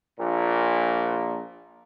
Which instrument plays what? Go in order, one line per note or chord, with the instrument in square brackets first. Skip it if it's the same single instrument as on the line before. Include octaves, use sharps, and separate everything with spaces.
[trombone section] A#1 A#2